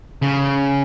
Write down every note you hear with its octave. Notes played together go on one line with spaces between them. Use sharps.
C#3